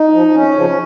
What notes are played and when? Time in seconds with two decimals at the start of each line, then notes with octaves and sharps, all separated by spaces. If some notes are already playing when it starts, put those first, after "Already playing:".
Already playing: D#4
0.12 F3
0.34 F2 C#4
0.55 C#3 F3